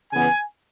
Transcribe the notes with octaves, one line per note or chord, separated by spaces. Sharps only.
C#3 E3 B3 G#5